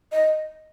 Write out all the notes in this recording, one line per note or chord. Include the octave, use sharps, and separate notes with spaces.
D#5